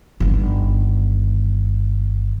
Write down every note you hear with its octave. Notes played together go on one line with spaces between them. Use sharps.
G1 D#3